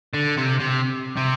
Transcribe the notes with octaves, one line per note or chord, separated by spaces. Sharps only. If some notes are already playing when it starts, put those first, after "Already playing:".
D3
C3
C3
C3